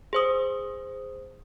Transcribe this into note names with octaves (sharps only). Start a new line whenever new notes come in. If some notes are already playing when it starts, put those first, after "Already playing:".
G#4 C5 D#6